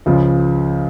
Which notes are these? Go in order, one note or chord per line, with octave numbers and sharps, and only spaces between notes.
C#2 C#3 F3